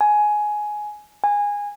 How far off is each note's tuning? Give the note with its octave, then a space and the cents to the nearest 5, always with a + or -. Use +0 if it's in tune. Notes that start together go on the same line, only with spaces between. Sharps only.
G#5 +10
G#5 -20